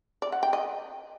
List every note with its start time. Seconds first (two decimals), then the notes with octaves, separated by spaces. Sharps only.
0.22 D5
0.32 F#5
0.43 G5
0.53 D#5